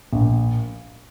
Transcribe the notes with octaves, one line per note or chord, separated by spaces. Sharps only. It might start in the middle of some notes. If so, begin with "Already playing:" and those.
A#1